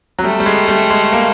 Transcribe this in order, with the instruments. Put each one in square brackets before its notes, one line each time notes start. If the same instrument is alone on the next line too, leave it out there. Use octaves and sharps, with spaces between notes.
[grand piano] F#3
[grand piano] G3 [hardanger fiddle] A3
[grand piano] G3
G#3
G3
G#3
A#3